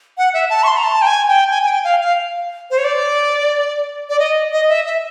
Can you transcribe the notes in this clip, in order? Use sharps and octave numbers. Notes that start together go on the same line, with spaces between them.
F#5
E5
A5
C#6
C6
A#5
A5
G5
G#5
G5
G#5
G#5
G5
F5
F5
C5
C#5
D5
D5
D#5
D#5
E5
E5